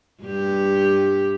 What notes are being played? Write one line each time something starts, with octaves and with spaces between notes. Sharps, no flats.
G2 G4